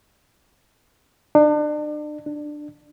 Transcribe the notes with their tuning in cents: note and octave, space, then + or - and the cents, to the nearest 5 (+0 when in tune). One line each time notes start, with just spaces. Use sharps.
D4 +35
D4 +15